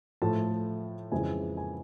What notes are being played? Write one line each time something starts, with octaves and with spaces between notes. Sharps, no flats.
A2 F3 A3 A5
F2 C#3 E3 G#3 G#5
G#5